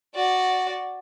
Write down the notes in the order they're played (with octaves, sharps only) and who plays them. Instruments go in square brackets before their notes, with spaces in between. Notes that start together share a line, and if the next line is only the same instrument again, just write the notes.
[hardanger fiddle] F#4 D5